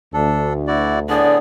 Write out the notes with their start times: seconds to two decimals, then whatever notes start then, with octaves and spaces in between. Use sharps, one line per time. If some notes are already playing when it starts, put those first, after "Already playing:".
0.14 D2 D4 A4
0.67 E4 F#4 D5
1.09 A2 D3 B3 G#4 D5